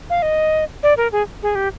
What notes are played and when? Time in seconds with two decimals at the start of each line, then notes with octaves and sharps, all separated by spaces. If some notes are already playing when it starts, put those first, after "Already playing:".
0.10 F5
0.22 D#5
0.83 D5
0.97 A#4
1.12 G#4
1.43 G#4
1.55 G4